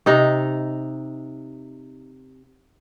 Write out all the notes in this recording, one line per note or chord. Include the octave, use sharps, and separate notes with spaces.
C3 D#4